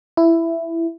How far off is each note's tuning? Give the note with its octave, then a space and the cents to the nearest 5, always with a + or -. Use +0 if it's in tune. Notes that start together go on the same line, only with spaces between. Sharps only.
E4 +10